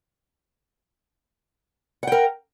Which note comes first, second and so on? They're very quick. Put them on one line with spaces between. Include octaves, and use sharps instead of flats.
F#5 G5 A#4